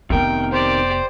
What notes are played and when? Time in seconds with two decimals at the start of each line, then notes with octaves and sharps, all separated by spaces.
0.10 F1 C3 D#3 B3 A#4 G5
0.52 G4 C5 D5